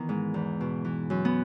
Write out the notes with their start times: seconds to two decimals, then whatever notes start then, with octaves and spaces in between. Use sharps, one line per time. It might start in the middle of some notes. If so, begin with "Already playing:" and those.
Already playing: D#3 E3 B3
0.09 G#2
0.34 E2
0.61 B2
0.85 E3
1.10 F#2
1.25 B3